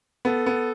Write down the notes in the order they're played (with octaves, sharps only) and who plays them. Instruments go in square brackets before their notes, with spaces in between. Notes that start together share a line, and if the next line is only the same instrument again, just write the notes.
[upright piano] B3 [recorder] A4
[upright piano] B3